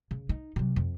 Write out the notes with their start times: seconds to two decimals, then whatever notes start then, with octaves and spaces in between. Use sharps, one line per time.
0.11 C#3
0.29 D#4
0.56 C3 F#3
0.76 F2